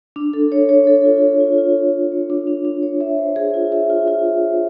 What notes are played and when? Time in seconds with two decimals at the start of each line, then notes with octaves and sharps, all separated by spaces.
0.16 D4
0.33 A4
0.52 C#5
0.69 C#5
0.87 A4
1.05 F4
1.23 A4
1.40 F4
1.58 F4
1.76 A4
1.94 C#5
2.12 C#5
2.30 D4
2.47 D4
2.65 D4
2.83 C#5
3.01 E5
3.18 C5
3.36 G#4
3.54 F4
3.72 E5
3.90 F4
4.08 F4
4.25 G#4
4.43 C5